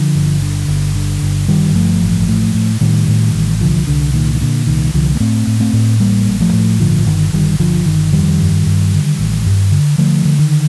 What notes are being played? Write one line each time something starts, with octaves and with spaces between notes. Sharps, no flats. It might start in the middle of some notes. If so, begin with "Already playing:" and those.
Already playing: D3 F3
G1
D3
G1
D3
G1
G2 D#3 G3
G1 F3 A3
A1
A2
A2
A2 D#3 G3
A2
A1
C2 D3 F3
C2 D3
A#2 D#3
D#3
A#2 D3
C2 D#3
C2 D3 F3
A#3
A2 A3 C4
A2
A3 C4
A2
A1 G3 A#3
A1
F3 A3
A2
G1 D3 F3
G1 D#3
G1 D#3 G3
G1 D3 F3
G1 D#3
F2 D#3 G3
G2
G2
D3
A1
G2
D3
D3 F3 A3
D3
D#3